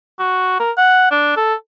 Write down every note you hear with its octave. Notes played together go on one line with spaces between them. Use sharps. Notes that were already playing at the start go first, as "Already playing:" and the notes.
F#4
A#4
F#5
D4
A4